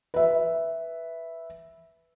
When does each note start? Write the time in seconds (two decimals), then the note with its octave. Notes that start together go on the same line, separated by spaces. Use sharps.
0.14 B4 E5